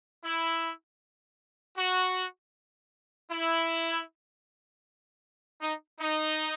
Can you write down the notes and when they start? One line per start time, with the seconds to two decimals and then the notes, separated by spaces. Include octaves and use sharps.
0.25 E4
1.78 F#4
3.31 E4
5.62 D#4
6.00 D#4